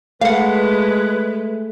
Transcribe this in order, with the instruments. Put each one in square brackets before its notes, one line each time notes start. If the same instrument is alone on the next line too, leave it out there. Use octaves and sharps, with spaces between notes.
[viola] G#3 [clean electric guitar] A3 [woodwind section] B4 [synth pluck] F5 F#5